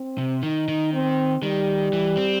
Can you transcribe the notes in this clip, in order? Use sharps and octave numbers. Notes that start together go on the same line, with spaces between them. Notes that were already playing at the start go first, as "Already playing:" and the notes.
Already playing: C4
C3
D#3 D#4
D#3
C4
D#3 G3
E3
C4